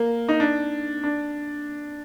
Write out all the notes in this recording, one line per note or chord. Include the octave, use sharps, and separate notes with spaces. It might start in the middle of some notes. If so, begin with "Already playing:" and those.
Already playing: A#3
D#4
D4
D4